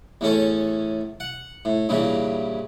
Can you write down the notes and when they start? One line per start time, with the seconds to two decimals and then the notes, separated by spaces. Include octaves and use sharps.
0.21 E2 A2 C#4 A4
1.20 F#5
1.65 A2
1.89 G2 A#2 C#3 E3